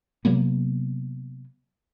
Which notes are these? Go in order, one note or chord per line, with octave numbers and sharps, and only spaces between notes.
C3 F#3 A#3 B3